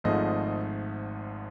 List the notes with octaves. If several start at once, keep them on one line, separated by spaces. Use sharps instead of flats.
G#1 G#2 F3 A3 D#5